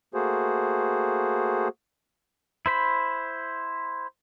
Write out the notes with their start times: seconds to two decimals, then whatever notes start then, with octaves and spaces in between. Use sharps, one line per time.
0.14 A3 A#3 F#4 G#4 C5
2.66 E4 C5 B5